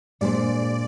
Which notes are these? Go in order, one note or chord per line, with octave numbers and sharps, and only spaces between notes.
A#2 G#3 D4 G#4 C5 D5